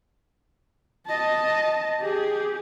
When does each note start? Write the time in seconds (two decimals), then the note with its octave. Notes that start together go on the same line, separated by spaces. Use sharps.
1.07 D#5 A5
2.01 G4 G#4